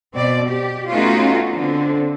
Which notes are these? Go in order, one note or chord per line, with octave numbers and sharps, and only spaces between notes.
B2 C4 D5
G4
A3 B3 C#4 D#4 F4 F#4
D3 C4